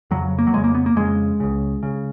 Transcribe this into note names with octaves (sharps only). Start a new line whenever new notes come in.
F2 C#3 F#3
A#3
F#3
F2 C#3 G#3
A#3
B3
A#3
F2 C#3 G#3
C#2 C#3
C#3